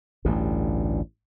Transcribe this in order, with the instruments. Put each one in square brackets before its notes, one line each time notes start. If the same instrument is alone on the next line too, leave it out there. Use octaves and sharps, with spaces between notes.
[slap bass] A1 D2 G2